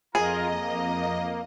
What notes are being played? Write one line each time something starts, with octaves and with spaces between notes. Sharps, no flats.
F2 F4 G#4 A#4 D#5 A#5
A#3